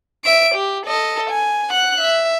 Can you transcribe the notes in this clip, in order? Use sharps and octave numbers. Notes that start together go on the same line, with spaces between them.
E5 D7
G4
A4 D#5
G#5
F#5 F#6
E5